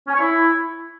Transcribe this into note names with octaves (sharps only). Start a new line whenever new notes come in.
C#4
C#5
E4